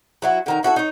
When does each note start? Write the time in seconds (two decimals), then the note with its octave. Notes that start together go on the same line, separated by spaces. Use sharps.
0.22 F#3 E4 F#4
0.46 D3 D#3 A#4
0.63 E4 F#4 G4 A4
0.76 D#4 C#5